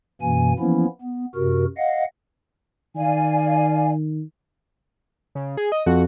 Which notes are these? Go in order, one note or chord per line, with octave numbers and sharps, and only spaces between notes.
F#2 B2 E3 A#3 G#5
E3 F3 A#3 B3 C#4 E4
B3
F#2 C3 F#4 A#4
D#5 F5 F#5
D#3 D5 F5 G#5
C#3
G#4
D#5
F2 F#4